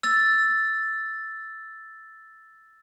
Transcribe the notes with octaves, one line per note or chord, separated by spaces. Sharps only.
E6 A6